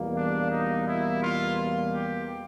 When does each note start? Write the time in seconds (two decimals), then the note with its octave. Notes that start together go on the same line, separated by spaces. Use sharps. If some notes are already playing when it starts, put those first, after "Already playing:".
Already playing: E2 B2 G3 A#3
0.15 D4
0.50 D#4
0.86 E4
1.21 F4
1.93 G4